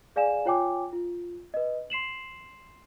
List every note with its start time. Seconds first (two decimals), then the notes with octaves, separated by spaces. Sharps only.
0.16 G#4 D5 F5 G#5 E7
0.45 F4 C#5 G5 G#5 D6
0.93 F4
1.54 B4 D#5
1.90 C6 C7 E7 F#7